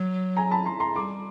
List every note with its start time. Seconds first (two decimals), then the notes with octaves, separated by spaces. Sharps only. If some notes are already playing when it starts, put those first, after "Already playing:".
Already playing: F#3
0.37 G#5 A#5
0.51 A5 B5
0.66 A#5 C6
0.80 A#5 C6
0.96 G3 C6 D6